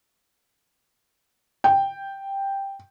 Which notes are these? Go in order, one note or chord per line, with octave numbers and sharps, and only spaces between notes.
G5